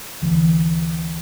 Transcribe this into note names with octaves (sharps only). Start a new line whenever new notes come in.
D2 D3 E3